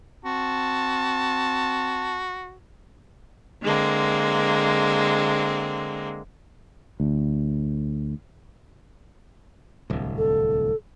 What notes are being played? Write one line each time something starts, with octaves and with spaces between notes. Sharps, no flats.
C4 F#4 A5
D3 G#3 A#3 C4
D2
D1 C2
A4